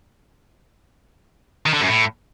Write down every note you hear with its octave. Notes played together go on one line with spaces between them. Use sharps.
D#3
D3
F#2
A2